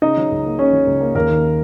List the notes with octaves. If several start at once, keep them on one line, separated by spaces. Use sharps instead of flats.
C#3 D#4 D#5
F#3
C#2
A#3
C#3 C#4 C#5
F#3
C#2
A#3
D#2 A#3 A#4
D#3